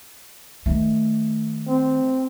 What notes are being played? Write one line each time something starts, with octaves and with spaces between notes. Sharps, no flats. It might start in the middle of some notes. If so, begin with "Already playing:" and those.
D#3 A3
C4